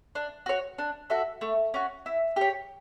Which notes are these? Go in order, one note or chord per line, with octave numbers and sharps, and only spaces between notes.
D4
F#4 C#5
D4
F#4 A4 E5
A3
C#4 F#4
E4
G4 C#5